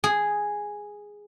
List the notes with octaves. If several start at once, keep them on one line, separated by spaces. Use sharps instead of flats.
G#4